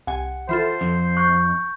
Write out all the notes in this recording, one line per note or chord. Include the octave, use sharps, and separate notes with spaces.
C2 F#5 G#5
E3 F4 A4 C5
F2
C#6 F#6 G6